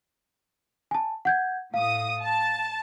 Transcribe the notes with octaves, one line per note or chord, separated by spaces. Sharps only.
G#5 A5
F#5 G6 G#6
A2 F5 D#6
A5